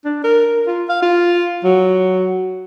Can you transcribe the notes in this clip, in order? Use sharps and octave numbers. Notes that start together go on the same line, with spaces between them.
D4
A#4
F4
F5
F4
F#3